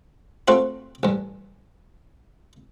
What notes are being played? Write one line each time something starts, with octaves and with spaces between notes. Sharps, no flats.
A3 C4 F4 F#4
A1 G2